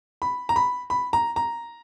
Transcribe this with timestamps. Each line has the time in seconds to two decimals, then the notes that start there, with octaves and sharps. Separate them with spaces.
0.22 B5
0.49 A#5
0.56 B5
0.90 B5
1.13 A#5
1.36 A#5